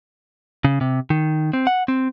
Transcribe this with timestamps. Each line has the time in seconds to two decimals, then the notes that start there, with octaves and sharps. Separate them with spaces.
0.65 C#3
0.81 C3
1.10 D#3
1.53 C4
1.67 F#5
1.88 C4